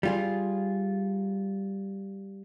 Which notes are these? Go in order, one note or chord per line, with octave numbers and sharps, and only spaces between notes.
G3 F4 G#4